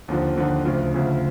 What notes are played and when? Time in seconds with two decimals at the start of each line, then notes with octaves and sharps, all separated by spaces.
0.08 D#2 D3 F3
0.36 D#2 D3 F3
0.65 D2 C#3 F3
0.94 D2 C#3 F3